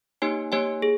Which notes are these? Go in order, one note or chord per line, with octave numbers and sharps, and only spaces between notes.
A#3 D#4 G4 C#5 G#5
A#3 D#4 G4 C#5 G#5
G#4